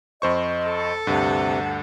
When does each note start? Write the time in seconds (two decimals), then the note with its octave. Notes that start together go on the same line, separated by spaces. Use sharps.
0.22 F2 C5 D#5 C#6
0.65 A4
1.07 D2 G2 C3 F#5